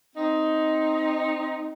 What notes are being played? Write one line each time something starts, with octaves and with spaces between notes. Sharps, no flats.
C4 D#4